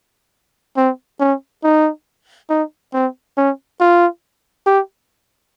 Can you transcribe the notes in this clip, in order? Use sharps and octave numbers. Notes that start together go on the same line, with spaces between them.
C4
C#4
D#4
D#4
C4
C#4
F4
G4